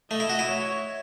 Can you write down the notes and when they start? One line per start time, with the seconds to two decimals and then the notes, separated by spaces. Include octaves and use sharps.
0.11 A3 D#5
0.20 E4
0.29 F#4
0.39 E4
0.48 C#5